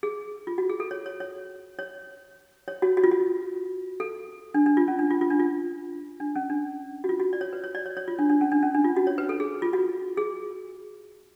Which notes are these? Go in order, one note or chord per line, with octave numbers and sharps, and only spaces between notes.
G#4
F4
F#4
G#4
A4
C#5
C#5
C#5
C#5
C#5
F#4
F#4
F4
F#4
A4
D4
D4
F4
C#4
D4
F4
F4
D4
F4
D4
C#4
D4
F#4
F4
F#4
D5
C#5
B4
C#5
D5
C#5
C#5
F4
D4
D4
C#4
D4
C#4
D4
F4
F#4
C#5
B4
A4
G#4
F4
F#4
G#4